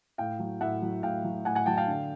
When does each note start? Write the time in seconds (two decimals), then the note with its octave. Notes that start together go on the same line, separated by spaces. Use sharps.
0.18 A2 F5 G5
0.39 F#3
0.61 A2 E5 F#5
0.82 F#3
1.03 A2 F5 G5
1.24 F#3
1.45 A2 F#5 G#5
1.55 F#5 G#5
1.66 F#3 G5 A5
1.77 F5 G5
1.87 D3